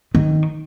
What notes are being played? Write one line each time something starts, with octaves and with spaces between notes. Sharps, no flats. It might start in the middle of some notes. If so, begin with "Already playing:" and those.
D#3